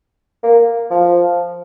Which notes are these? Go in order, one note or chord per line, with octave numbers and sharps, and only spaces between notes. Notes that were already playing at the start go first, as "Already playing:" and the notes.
A#3
F3